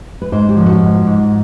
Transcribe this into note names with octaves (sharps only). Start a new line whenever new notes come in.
B4
G#2 C5
G4
F3
F#4
G#2
G#2